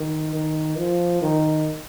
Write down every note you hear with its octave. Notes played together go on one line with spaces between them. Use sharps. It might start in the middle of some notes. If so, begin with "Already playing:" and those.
Already playing: D#3
D#3
F3
D#3